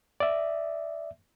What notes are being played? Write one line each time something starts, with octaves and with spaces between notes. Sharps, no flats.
D5 E5